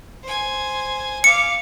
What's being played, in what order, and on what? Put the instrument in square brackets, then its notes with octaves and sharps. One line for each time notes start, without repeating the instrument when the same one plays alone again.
[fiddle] C5 G#5
[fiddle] F5 D6 [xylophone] C#7